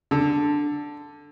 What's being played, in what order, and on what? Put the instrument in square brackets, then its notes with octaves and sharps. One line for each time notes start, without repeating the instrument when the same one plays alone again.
[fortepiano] D3